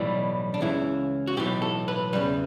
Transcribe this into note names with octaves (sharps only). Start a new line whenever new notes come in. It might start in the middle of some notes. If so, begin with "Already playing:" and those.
Already playing: B1 A2 E3 G3
D4
C#2 C#3 E3 E4
F#4
B1 A2 E3 G4
A4
B4
E2 C#3 G3 B4